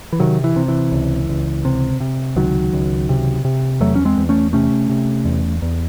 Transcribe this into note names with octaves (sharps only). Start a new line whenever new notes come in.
E3
C3 D#3 F#3
E3
C3
E3
C#2
C#2
C3
C3
C#2 D#3 F#3
C#2
C3
C3
E2 F#3 A3
C#4
G#3 C4
E2
A3 C#4
C3 A3 C#4
C3
E2
E2